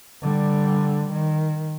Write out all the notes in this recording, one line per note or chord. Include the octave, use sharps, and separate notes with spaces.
D3 G3
D#3